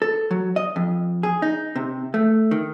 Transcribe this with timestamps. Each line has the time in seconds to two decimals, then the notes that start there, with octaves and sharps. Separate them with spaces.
0.02 A4
0.31 F#3
0.56 D#5
0.76 F2
1.23 G#4
1.42 D#4
1.76 C3
2.14 A3
2.51 D#3